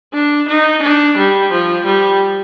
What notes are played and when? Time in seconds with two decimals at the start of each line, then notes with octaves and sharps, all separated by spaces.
0.13 D4
0.48 D#4
0.82 D4
1.17 G3
1.51 F3
1.86 G3